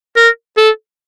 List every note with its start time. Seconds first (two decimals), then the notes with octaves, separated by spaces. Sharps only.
0.16 A#4
0.57 A4